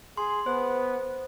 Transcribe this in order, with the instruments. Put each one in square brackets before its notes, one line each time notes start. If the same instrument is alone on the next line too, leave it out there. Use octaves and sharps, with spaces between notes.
[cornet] G#4 [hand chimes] C6
[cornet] B3 [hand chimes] C5